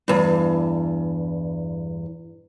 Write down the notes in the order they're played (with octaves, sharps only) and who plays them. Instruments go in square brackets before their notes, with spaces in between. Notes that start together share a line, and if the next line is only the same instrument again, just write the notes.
[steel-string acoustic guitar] E2 G2